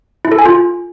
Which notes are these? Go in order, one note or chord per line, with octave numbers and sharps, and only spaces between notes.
E4
A4
G#5
F4